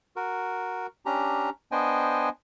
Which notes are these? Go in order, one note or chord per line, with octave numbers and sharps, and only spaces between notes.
F#4 A#4
C#4 D4 G4 A#5
B3 D4 C5 D#5 G5 G#5